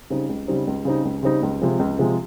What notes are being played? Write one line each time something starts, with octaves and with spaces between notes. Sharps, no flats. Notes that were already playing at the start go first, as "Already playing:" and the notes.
C#3 G3 C4 D#4
C#2
C#3 G3 C4 D#4
C#2
C#3 G3 C4 D#4
C#2
C#3 G3 C4 D#4
C#2
C3 F3 G#3
C#2
C3 F3 G#3